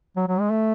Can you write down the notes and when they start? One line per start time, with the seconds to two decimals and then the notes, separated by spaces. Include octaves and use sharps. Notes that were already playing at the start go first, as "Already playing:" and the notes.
0.16 F#3
0.28 F#3
0.40 G#3
0.50 A3